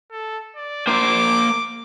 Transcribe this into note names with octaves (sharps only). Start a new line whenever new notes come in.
A4
D5
A#3 C5 D6